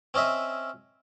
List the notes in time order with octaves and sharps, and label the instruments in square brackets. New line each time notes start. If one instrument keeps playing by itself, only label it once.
[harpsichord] C4 C#4 D#5 E5